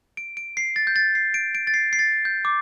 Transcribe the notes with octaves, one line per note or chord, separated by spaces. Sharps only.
D7
D7
C7
A6
G6
A6
C7
D7
D7
A6
C7
C7
A6
G6
D6